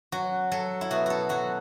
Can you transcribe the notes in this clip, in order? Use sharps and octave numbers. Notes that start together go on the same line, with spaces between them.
F#3 F#4
F#3 A4
E4
B2 F#4
F#4 A4
F#3 F#4